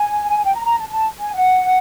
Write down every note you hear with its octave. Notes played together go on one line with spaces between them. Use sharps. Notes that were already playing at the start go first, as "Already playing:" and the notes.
Already playing: G#5
G5
A#5
A#5
A5
A5
G#5
F#5